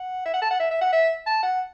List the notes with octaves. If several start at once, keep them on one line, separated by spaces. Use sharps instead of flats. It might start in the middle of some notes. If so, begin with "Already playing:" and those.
Already playing: F#5
E5
F#5
A5
F#5
E5
E5
F#5
E5
A5
F#5